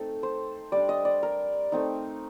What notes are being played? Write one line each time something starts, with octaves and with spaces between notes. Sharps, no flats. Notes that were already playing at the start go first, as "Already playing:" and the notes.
Already playing: A3 C4 D#4 A4
C5
G3 D4 D5
D#5
D5
A#4
A3 C4 D#4